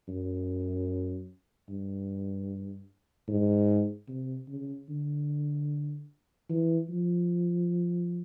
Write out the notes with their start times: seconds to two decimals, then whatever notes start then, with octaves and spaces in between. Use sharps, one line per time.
0.08 F#2
1.69 G2
3.28 G#2
4.08 C3
4.48 C#3
4.89 D3
6.49 E3
6.89 F3